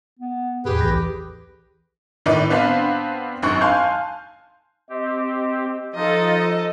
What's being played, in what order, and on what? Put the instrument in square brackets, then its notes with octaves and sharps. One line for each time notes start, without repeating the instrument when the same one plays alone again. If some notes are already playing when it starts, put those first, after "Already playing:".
[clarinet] B3
[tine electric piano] E2 A2 [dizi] G4 [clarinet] G#4 [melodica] B4
[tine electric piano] B1 E3 A#6
[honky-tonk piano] A2 D#3 D#4 B4 D5
B3 C4 D4 B4 C5 F5
G#1 F#2 C4 C#6 F#6
F5 G#5 A5 C6 F6 G6
[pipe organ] C4 G4 [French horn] D#5
[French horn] F3 [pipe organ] D#4 F4 [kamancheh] A4 D#5